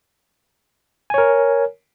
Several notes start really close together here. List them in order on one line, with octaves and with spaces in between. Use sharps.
G#5 C#5 A#4